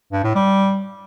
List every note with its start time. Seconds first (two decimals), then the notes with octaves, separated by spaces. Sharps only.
0.12 G2
0.24 A2
0.35 G3